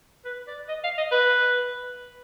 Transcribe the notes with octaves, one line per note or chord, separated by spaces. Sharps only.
B4
D5
D#5
F5
D#5
B4